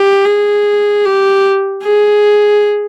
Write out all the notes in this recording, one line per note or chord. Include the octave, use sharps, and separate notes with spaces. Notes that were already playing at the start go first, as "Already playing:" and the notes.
Already playing: G4
G#4
G4
G#4